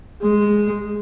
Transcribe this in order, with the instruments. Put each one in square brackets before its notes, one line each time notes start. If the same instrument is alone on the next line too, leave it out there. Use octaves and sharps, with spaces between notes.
[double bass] G#3